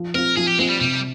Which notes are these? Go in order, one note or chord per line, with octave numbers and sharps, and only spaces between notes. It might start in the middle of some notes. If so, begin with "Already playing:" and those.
Already playing: F3
C4 F4 A#4
F3 G#4
G4
G#3 C4 F4
G3
C3 G3